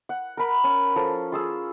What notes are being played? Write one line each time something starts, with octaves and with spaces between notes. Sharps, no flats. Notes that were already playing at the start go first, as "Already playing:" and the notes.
F#5
A#4 B5
C#4
F3 A4
F4 G#4 E6